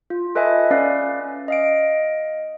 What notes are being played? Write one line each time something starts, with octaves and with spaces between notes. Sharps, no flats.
F4
A4 B4 D#5 E5 G#5
C#4 B4 D5 F5
D#5 F5 D7